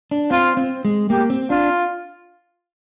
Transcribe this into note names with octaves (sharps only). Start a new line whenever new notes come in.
D4
C4 F4
C4
G#3
A#3 G4
C4
D4 F4